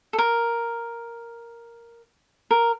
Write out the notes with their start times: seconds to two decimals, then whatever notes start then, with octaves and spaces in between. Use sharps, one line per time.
0.13 A4
0.18 A#4
2.51 A#4